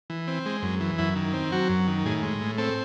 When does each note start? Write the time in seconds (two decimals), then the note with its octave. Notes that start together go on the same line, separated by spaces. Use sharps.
0.10 E3
0.28 C4
0.46 G#3
0.62 F#2
0.80 E3
0.98 F#2 E4
1.16 D#3
1.33 C4
1.52 F#3 F#4
1.69 F#2
1.87 D#3
2.06 A2 G#4
2.23 G#3
2.41 A2
2.58 C4 A4